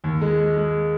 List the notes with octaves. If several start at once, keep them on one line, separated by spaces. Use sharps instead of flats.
D#2
G#3
G#3
G#3